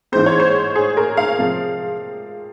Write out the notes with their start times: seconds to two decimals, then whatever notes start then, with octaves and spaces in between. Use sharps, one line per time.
0.12 G#2 E3 G#3 C4 C5
0.26 C#5
0.40 C5
0.76 G#4
0.97 A#4
1.17 F5
1.38 C3 F3 G#3